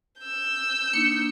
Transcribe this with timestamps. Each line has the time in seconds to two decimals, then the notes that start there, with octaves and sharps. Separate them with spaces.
0.20 E6 G6
0.93 A#3 D4 D#4 C#7